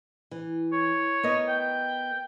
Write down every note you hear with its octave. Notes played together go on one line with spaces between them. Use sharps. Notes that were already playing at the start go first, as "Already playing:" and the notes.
E3
C#5
B3 A#4 D#5
G5